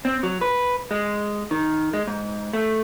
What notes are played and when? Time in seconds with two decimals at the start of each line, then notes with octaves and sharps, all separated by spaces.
0.05 C4
0.23 F#3
0.41 B4
0.91 G#3
1.51 D#3
1.94 G#3
2.07 G#2
2.53 A3